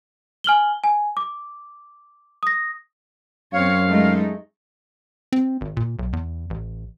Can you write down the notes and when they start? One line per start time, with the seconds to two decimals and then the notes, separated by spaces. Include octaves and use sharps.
0.44 G#5 F6 F#7 G7
0.84 G#5
1.17 D6
2.43 D#6 A#6
3.53 F#2 C4 C#5 F5
3.88 G#3 A3 D#4
5.33 C4
5.61 G#1
5.77 A#2
5.99 B1
6.13 E2
6.50 A1